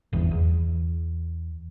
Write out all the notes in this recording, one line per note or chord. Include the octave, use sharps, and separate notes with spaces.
G1 E2
E2